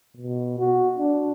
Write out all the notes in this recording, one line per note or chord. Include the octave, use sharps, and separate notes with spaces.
B2
F#4
D4